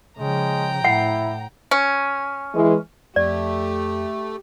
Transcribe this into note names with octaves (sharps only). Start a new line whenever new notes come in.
C#3 F3 G#3 G5 A#5
A2 E4 F#5
C#4
E3 G#3
F2 A3 G4 D5